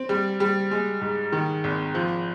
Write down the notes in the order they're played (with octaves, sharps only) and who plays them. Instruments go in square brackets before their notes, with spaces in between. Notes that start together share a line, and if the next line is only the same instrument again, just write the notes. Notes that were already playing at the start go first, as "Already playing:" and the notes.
Already playing: [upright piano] C4
G3
G3
G#3
G#2
D#3
G#1
F3